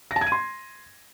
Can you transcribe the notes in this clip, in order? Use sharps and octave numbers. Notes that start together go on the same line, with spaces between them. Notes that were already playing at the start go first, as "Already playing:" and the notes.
A#6
A5
G#6
D#7
C6